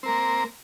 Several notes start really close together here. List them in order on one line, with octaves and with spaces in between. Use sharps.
C4 A#4 A#3